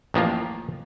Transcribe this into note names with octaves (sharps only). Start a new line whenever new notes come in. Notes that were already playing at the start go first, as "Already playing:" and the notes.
A1 D#3 F3 A#3 F4